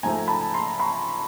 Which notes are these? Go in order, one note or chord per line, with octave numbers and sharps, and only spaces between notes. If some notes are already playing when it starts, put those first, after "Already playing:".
G#2 F3 A3 G#5 A#5
A5 B5
A#5 C6
B5 C#6